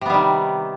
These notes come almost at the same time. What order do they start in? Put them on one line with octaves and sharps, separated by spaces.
C3 B3 G3 D#3